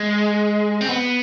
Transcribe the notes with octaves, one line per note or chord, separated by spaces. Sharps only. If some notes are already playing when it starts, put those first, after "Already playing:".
Already playing: G#3
C4
B3